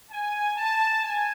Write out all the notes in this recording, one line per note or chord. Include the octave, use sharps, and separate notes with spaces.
G#5
A5
G#5